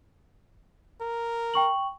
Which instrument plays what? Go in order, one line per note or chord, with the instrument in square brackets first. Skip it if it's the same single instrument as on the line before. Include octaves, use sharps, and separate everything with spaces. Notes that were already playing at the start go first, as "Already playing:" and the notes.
[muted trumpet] A#4
[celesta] G5 C#6 F#7